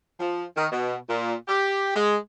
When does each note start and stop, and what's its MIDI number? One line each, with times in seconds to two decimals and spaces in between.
0.19 0.44 53
0.56 0.66 51
0.72 0.96 47
1.08 1.34 46
1.48 1.92 67
1.95 2.16 56